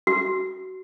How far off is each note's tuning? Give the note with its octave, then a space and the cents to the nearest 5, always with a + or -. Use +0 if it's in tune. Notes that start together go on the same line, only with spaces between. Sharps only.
F#4 +20